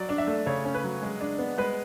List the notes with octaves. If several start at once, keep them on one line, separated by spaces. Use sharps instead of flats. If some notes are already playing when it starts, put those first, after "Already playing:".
Already playing: F#3 D5
D4
E5
A3
C#3 C#5
C#4
B4
F#3
G#3
D4
B3
G#3 B4